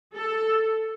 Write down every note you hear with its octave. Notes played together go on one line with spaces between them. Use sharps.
A4